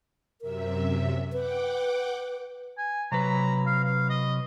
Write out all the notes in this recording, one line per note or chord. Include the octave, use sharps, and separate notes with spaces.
F#2 C3 A#4 E5
B4 F#5 G5 D6
G#5
C3 F#3 B4 A#5
F5
F5
D#5